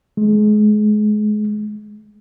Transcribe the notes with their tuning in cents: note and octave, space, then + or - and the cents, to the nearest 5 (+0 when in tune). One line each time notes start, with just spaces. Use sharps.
G#3 +30